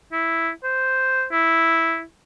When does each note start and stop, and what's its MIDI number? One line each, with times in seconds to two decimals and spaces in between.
0.12 0.50 64
0.64 1.25 72
1.32 2.02 64